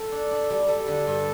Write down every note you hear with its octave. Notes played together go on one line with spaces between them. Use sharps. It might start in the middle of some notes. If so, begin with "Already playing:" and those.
Already playing: A4
D4
D4
G3
G3 A4
D3
G2